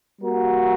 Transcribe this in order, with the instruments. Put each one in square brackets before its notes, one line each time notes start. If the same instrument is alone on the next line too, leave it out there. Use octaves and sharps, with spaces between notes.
[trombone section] G3 A#3 F#4 A#4